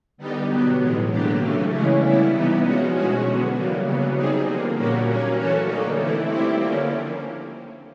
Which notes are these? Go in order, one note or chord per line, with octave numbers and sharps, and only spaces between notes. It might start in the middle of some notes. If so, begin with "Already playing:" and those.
D3 G3 B3 D#4 G4
B2 F#3 B3
A2 E3 G#3
D3 F#3 A#3 D4 G4
C#3 E3 A3 C#4
C#3 E3 G#3 C#4 E4
G3 B3 E4
C3 E3 G3 B3 D#4
F3 G#3 C#4 F#4
B2 G#3 C#4 F#4
D3 F#3 B3
C#3 E3 G3 A#3
C#3 F#3 B3
G3 C4 D#4 G#4
D3 F3 A#3
A#2 G3 A#3 C#4 F#4
F#3 A#3 C#4
E3 A3 C#4 F#4 A4
D3 G3 A#3 D#4
E3 A3 C4 E4
G3 C4 E4 G4
D3 F3 A#3 C#4